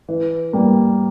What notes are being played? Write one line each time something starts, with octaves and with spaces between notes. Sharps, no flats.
E3
G3 A#3